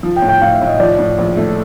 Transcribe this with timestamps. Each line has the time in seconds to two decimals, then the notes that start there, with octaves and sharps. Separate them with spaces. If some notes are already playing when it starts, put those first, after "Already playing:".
0.03 F3
0.16 G5
0.22 A2
0.29 G5
0.41 A2 F5
0.54 E5
0.61 A2
0.67 D#5
0.80 F3 D5
0.98 A2
1.18 A#1
1.37 A3